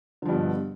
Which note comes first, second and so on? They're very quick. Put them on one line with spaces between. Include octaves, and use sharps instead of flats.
D3 F3 G2 B2